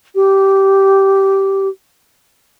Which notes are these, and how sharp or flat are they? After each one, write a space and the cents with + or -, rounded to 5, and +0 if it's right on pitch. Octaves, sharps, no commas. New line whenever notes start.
G4 -15